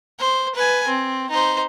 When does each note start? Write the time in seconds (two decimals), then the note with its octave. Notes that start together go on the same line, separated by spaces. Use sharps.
0.20 C5
0.55 B4 G#5
0.88 C4
1.30 D#4 C5